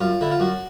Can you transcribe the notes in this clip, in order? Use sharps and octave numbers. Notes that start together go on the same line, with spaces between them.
F#2 F4
D3 E4
F4
F#2 F#4